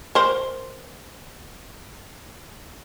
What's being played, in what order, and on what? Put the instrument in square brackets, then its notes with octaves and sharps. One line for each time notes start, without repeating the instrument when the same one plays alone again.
[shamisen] A#4 C5